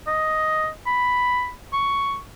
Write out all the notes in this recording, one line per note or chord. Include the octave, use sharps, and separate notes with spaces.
D#5
B5
C#6